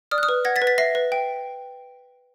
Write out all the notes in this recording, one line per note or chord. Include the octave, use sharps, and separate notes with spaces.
D5 D#6 F6
F#6
D#6 F6
B4
F#5 G#6 A#6
A6 B6
B4
A6 B6
E5 A#6 C7
B4
G5